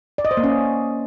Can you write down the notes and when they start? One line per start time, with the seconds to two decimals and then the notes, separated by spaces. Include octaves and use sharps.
0.18 D5
0.25 D#5
0.31 C5
0.37 A#3
0.44 C#4